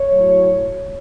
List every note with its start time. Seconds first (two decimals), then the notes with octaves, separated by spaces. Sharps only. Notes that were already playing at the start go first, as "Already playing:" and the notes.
Already playing: C#5
0.12 A2 F#3